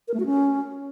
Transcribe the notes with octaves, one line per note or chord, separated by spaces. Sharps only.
A#4
A3
F#4
C#4